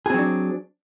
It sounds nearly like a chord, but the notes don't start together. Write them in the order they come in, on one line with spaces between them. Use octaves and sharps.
G#4 C4 F#3 D4